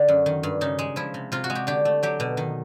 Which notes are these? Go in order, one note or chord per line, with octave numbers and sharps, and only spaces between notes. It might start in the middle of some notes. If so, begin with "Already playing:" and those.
Already playing: D3 D4
F#2
D#3
G2
C#3 D#4
G#3
F3 E4
C3
C3 F4
F#4
G#3
G4
D3 G4
A3
F#3 G4
B2
D#3